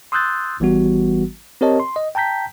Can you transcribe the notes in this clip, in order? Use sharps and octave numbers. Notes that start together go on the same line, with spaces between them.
C6 D#6 E6 F#6 G6 A6
G#1 E3 G3 B3 F#4
C4 G4 A#4 C#5 D#5 A5
C6
D#5
G5 A5 A#5 G6 B6